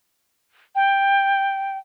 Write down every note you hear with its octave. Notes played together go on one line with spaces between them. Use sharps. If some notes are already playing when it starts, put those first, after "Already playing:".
G5